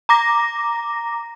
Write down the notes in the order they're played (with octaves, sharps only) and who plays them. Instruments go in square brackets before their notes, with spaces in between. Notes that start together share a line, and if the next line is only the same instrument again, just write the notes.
[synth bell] A#5 D6 A#6